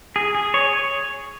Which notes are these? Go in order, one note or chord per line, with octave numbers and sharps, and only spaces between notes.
G#4
G#4
C#5